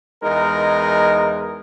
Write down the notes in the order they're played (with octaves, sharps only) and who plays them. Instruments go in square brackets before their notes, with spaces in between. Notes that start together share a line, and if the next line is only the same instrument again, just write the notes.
[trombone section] E2 G#3 D#4 A#4